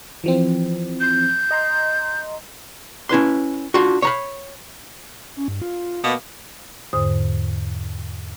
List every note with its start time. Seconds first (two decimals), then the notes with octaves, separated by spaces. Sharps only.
0.24 E3 F3 C4
1.00 G6
1.51 D#5 A#5 C6
3.09 C#4 E4 B4 C6
3.74 D4 F4 F#4
4.02 C#5 A#5 B5
5.37 C#4
5.48 G2
5.62 F4
6.04 B2 A#3 B3
6.93 E2 G#2 D3 C5 D#6